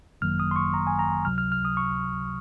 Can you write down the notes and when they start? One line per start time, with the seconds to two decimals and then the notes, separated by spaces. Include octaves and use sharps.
0.21 G#1 F#2 D#3 F#3 A#3 F6
0.40 D#6
0.51 C6
0.56 C#6
0.74 A#5
0.87 G#5
0.99 A#5
1.25 C#2 C3 F#3 F6
1.38 F6
1.52 F6
1.65 D#6
1.77 C#6